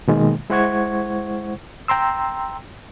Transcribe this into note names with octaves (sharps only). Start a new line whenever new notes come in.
B2 D#3 G#3 A#3
G#3 E4 C5 F#5 C#6 G#6
G5 A#5 C6 E6